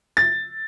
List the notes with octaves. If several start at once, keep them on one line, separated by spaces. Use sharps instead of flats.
A6